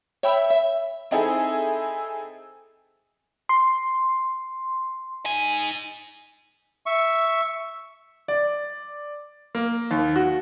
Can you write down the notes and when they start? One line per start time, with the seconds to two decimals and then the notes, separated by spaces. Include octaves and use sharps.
0.23 C#5 E5 G5 B5 E6
0.50 E5
1.11 C4 D#4 E4 G#4 A4
3.49 C6
5.26 D#4 G#5
6.86 E5 C#6
8.28 D5
9.55 A#3
9.91 D#2
10.16 F#4